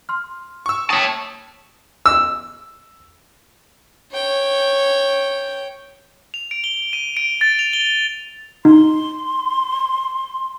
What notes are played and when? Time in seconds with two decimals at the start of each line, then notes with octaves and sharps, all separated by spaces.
0.09 C6 F6
0.66 C#6 E6
0.90 C#5 G5 A5 D#6
2.06 E6
4.12 C#5 G5
6.34 F7
6.51 D7
6.64 G7
6.93 D#7
7.17 D7
7.41 A6
7.59 F7
7.73 G7
8.65 D#4 C6